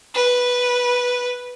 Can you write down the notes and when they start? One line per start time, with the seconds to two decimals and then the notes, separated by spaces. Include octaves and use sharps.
0.14 B4